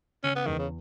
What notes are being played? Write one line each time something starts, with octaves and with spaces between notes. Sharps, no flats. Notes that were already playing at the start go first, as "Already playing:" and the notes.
C#3 C#4
B3
E2 D#3
C#3